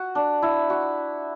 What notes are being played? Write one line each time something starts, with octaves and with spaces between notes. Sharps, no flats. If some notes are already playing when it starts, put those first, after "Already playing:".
Already playing: F#4
D4
E4
F#4